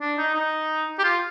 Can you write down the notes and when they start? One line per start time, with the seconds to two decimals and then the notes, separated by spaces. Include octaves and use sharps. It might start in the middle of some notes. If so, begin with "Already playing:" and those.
0.01 D4
0.18 D#4
0.35 D#4
0.99 G4
1.04 F4